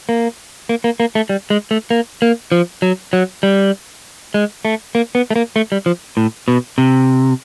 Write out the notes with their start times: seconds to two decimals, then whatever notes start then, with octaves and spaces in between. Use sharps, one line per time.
0.09 A#3
0.69 A#3
0.84 A#3
1.00 A#3
1.15 A3
1.29 G3
1.50 G#3
1.71 A3
1.91 A#3
2.22 A#3
2.52 F3
2.82 F#3
3.13 F#3
3.43 G3
4.34 G#3
4.65 A3
4.95 A#3
5.15 B3
5.30 A3
5.36 A#3
5.56 A3
5.72 G3
5.86 F3
6.17 A2
6.48 B2
6.78 C3